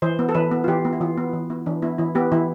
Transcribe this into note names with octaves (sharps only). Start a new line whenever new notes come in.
E3 C5
B3
A4
E3 B4
B3
F4
E3 G4
B3
E4
E3 F4
B3
E3
B3 E4
E3 D4
B3 E4
E3 E4
B3 G4
E3 E4